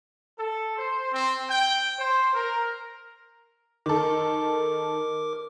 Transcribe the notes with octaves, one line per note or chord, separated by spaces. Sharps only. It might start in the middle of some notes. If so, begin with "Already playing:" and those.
A4
C5
C4
G5
C5
A#4
D#3 A4 A#4 D6